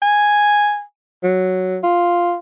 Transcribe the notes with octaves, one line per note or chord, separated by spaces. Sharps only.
G#5
F#3
F4